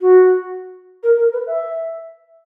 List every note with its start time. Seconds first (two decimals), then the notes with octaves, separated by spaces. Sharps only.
0.01 F#4
1.03 A#4
1.18 A#4
1.33 B4
1.47 E5